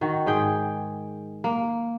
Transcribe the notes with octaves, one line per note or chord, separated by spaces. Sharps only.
D#3 F#4
G#2 G#4 G5
A#3